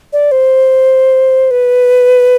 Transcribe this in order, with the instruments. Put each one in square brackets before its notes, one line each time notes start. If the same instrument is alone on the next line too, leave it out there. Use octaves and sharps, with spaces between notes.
[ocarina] D5
C5
B4